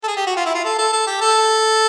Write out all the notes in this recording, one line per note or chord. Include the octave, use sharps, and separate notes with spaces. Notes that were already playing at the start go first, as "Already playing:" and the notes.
A4
G#4
G4
F#4
F4
E4
F4
A4
A4
A4
G4
A4